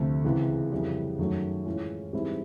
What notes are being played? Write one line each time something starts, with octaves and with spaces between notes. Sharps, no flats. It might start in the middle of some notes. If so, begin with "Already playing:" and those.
Already playing: D2 C3 F3 A3
C#2 C3 E3 G#3
F2 C#3 E3 G3
F#2 D#3 F#3 A3
A2 E3 G#3 C#4 F4
G#2 E3 G3 C4 E4